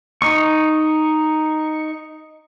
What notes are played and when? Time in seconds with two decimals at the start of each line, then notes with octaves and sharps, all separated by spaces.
0.22 D#4 C#6